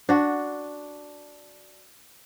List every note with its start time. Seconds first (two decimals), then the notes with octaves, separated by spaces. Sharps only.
0.09 D4 F#4